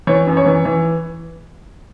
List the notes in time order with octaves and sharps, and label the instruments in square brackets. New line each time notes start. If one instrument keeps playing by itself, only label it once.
[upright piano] E3 C#5
F#2
C#5
E3
E3